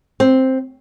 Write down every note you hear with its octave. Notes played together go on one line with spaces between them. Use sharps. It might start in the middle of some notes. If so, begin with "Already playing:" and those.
C4